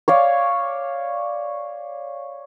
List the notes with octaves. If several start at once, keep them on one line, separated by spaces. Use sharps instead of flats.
C#5 D5 F5